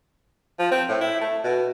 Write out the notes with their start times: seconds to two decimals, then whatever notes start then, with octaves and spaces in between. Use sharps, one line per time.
0.59 F3
0.71 C4
0.89 A2
1.01 E4
1.21 A3
1.44 B2